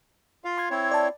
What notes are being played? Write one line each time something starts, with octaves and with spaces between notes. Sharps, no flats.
F4 F5
C6 G#6
C4 E4 C#5
D5 A5